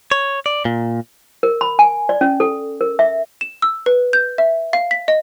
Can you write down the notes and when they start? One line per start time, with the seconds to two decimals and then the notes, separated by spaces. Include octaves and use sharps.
0.12 C#5
0.46 D5
0.65 A#2
1.43 A#4
1.61 B5
1.79 G#5
2.09 D5
2.21 C#4
2.40 A4
2.81 A#4
2.99 E5
3.41 E7
3.62 E6
3.86 B4
4.13 G6
4.38 E5
4.73 F5
4.91 B6
5.08 D#5